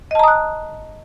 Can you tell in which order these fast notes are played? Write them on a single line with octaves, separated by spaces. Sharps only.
D#5 A5 A#5 D#6 F#6